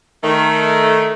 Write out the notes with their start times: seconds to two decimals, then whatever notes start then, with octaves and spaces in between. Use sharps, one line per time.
0.24 D#3 A3